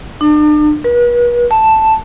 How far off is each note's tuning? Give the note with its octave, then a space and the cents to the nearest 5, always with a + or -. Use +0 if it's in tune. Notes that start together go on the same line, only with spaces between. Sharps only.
D4 +40
B4 -40
A5 +0